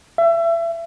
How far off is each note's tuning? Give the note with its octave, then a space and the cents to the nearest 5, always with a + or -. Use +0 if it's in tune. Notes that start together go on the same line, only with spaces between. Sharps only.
E5 +30